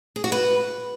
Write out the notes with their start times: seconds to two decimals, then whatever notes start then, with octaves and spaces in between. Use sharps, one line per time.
0.16 G#4
0.24 F#4
0.32 B4